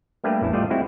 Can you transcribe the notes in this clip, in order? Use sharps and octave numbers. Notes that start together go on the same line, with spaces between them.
G3 A3 A#3 D4 G4 B4
A1 E2 E4 A5
G3 A3 F4 D5 D#5
G#3 C4 E4 F#4